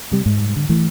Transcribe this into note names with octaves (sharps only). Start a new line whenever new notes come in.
C3 G3
G#2
D3
E3 A3